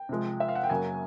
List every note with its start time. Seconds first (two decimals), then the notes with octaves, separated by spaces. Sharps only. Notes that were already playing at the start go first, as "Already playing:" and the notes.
Already playing: G5
0.09 C3 F3 G#3
0.40 E5
0.48 F5
0.55 F#5
0.63 G5
0.70 F#2 C#3 F#3 A#3 G#5